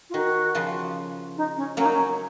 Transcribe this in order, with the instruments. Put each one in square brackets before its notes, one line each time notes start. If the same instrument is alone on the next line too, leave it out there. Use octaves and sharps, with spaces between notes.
[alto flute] F4
[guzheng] D#3 [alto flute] F#4
[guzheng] C#3 F3
[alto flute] D#4
C#4
[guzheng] F#3 A#3 [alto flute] C#4
[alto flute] D#4
C#4